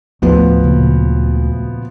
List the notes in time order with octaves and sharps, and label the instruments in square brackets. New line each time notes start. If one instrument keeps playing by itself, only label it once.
[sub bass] D2 [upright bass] A2 [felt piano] F3 B3
[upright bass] A#2 C#3